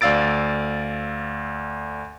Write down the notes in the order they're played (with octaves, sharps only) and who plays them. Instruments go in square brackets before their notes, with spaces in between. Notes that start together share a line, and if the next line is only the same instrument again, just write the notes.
[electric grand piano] D2 D5 F5 E6 A6 D7